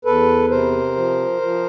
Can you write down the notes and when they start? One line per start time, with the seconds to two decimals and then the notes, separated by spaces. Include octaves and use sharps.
0.05 E2 A4 B4
0.50 C3 A#4 C5
0.96 F3
1.42 F3